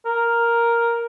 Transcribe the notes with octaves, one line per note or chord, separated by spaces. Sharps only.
A#4